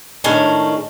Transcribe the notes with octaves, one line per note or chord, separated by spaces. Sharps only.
A2 D#3 G#3 C#4 D4